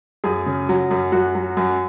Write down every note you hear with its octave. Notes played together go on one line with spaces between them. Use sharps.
F#2 G#4
C#3
F#3
F#2
F#2 F#4
F#3
F#2